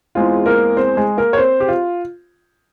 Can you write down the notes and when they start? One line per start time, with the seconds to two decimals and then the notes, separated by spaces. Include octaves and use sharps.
0.15 E2 E3 G#3 C4 F4
0.46 A#3 A#4
0.77 C4 C5
0.97 G#3 G#4
1.17 A#3 A#4
1.33 C#5
1.37 C4 C5
1.60 G4
1.68 F4